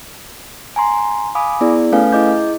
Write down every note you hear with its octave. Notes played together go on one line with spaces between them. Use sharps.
G#5 A#5 C6
F5 G#5 B5 D6 D#6
B3 E4 G#4 D5
A3 C#4 A4 B4 F5 G#5
E4 G#4 D#5 D6 G6